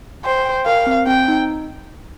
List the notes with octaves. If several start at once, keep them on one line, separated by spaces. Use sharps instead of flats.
C5 G5
G5
A#4 F5
C4
C4 G5
D#4